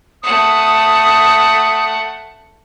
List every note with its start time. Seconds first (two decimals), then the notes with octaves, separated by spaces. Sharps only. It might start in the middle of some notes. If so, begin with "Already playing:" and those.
0.23 A3 F#5 D#6